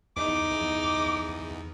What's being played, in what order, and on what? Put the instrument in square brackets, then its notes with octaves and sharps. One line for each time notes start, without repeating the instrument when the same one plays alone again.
[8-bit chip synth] E2 [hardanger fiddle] D#4 [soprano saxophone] D6
[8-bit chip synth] E2